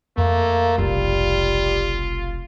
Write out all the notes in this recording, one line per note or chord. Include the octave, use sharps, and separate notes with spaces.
F2 A3 A#3
F1 B1 G3 F4